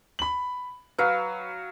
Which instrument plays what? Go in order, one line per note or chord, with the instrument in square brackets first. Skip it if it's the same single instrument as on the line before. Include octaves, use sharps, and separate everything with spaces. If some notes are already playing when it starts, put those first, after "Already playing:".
[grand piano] B5 F#7
[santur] F#3 F5 [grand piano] B4